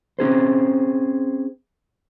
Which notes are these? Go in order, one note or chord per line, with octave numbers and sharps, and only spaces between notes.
C4 C#4 G#4 C5